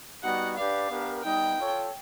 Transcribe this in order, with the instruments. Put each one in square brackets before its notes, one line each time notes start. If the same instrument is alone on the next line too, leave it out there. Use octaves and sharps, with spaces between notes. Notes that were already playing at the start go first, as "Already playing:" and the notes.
[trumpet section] G3 B3 D#4 F#4 [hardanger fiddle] F#5
[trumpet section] D4 G4 B4 D5 [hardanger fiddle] F5
[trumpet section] B3 D4 G4 A#4
[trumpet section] G3 B3 D#4 [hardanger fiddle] G5
[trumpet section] F4 A4 C#5